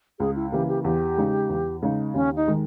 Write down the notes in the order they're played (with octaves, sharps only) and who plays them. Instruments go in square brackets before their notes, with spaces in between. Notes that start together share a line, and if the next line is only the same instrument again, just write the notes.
[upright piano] C#2 [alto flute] G#4
[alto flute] E4
[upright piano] C#3 E3 A#3 [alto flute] G4
[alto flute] G4
[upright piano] E2 [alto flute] G4
[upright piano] C#3 G#3 D#4
E2
C#3 G#3 D#4
[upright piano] D#2 [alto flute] C#4
[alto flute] D#4
[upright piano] D#3 G#3